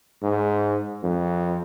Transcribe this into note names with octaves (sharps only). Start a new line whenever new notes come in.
G#2
F2